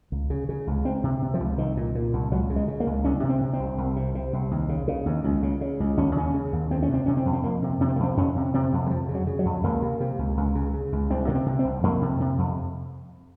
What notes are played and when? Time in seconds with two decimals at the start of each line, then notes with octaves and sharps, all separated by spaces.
0.12 C#2
0.30 C#3
0.49 C#3
0.67 C#2
0.85 C#2 C4
1.03 C3
1.22 C3
1.34 F3
1.40 C#2
1.58 C2 D#3
1.77 A#2
1.95 A#2
2.13 C2
2.32 C#2 F#3
2.50 C#3
2.56 G#3
2.68 C#3
2.80 A#3
2.87 C#2
3.04 C2 C#4
3.23 C3
3.29 C4
3.41 C3
3.53 C4
3.60 C2
3.78 C2
3.96 C3
4.15 C3
4.33 C2
4.51 D#2
4.69 C#3
4.88 C#3
5.06 D#2
5.24 C#2
5.43 C#3
5.61 C#3
5.80 C#2
5.97 D#2 C#4
6.16 C#3 C#4
6.34 C#3
6.52 D#2
6.71 F2 C4
6.82 C#4
6.89 C3 C4
7.06 C3 C#4
7.17 C4
7.25 F2
7.33 C4
7.44 F2 A#3
7.62 C3
7.81 C3 C#4
7.88 C4
7.96 A#3
7.99 F2 C4
8.17 F2 C#4
8.36 C3
8.54 C3 C4
8.73 F2
8.86 F#3
8.90 F2 F3
9.09 C#3
9.15 F#3
9.27 C#3
9.39 F#3
9.45 F2
9.64 C#2 A#3
9.82 C3
10.00 C3
10.19 C#2
10.37 C#2
10.55 C#3
10.74 C#3
10.92 C#2
11.10 C2 C4
11.27 C3 A#3
11.35 C4
11.46 C3
11.59 C4
11.65 C2
11.83 F2 A#3
12.02 C3
12.20 C3
12.38 F2